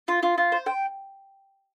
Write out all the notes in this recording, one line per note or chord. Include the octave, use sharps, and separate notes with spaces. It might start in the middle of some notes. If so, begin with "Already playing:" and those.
F4
F4
F4
C5
G5